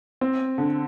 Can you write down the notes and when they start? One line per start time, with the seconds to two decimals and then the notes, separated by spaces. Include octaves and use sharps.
0.21 C4
0.58 D3